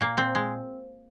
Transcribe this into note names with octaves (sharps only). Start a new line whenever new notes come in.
A#2 A#3
A#2 C4
G#3